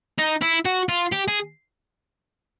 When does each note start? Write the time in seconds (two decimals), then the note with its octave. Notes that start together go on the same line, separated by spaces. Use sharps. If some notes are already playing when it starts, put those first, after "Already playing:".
0.18 D#4
0.41 E4
0.65 F#4
0.89 F4
1.12 G4
1.28 G#4